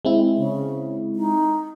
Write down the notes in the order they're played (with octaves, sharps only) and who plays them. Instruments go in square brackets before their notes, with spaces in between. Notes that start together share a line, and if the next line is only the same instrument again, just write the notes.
[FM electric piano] G#3 C4 E4
[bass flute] C#3
D#4